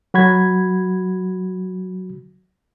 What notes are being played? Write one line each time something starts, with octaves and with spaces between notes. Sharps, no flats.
F#3 F#4 B5 G#6